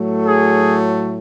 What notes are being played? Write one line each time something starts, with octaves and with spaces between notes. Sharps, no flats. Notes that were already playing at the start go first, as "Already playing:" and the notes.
Already playing: A2 F#3 A3
G#4